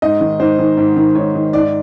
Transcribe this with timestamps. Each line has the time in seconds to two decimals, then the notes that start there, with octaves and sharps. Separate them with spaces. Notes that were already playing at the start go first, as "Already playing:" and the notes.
0.02 G#2 D#5
0.21 D#3
0.40 G#2 C5
0.59 D#3
0.77 G#2
0.96 D#3
1.15 G#2 C#5
1.35 D#3
1.53 G#2 D5